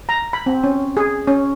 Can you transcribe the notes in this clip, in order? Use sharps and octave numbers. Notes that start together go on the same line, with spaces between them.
A#5
B5
C4
C#4
G#4
C#4